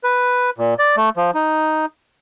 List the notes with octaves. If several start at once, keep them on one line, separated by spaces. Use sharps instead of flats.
B4
A#2
D5
A3
F3
D#4